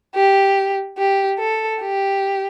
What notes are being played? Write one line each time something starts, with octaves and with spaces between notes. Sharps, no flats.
G4
G4
A4
G4